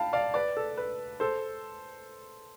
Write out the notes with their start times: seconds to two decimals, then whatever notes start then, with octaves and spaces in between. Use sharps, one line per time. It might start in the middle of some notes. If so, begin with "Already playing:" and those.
Already playing: F5 G5 A5 B5
0.13 D5 F5
0.34 B4 D5
0.57 A4
0.77 B4
1.20 A4 C5